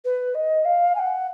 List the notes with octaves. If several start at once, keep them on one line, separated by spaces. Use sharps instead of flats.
B4
D#5
F5
G#5
F#5